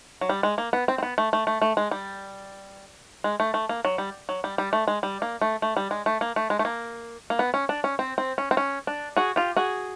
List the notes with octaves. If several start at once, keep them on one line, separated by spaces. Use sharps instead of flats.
F#3
G3
G#3
A#3
B3
C4
C4
B3
A3
A3
A3
A3
G#3
G3
G#3
A3
A3
A#3
F#3
G3
F#3
G3
G3
A3
G#3
G3
A#3
A3
A3
G3
G#3
A3
A#3
A3
G#3
A3
A#3
A#3
B3
C#4
D4
C#4
C4
C4
C#4
C4
C#4
D4
F#4 G#4
F4 G4
F#4 G#4